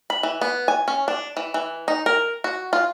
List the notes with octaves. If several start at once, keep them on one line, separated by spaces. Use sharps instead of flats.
B5
E3
B3
G#5
C#4
D4
E3
E3
D#4
A#4
F#4
F4